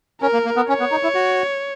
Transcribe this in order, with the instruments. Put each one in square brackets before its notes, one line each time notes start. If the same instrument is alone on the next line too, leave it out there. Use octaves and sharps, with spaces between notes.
[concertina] C#4 [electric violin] A#4
[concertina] A#3
A#3
B3
[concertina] C#4 [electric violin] C#5
[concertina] B3
D#4
E4
F#4